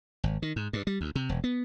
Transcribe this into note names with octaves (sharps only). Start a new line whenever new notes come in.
G#1
D#3
G#2
G2
G3
D2
C3
E1
B3